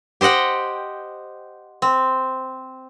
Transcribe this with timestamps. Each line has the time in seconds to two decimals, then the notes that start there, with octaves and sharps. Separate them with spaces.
0.21 G4 C5 D#5 F#5 G5
1.82 C4